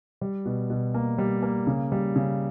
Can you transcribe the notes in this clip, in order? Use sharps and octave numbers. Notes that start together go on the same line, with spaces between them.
G3
B2
B2
A#3
G3
A#3
C#3
G3
C#3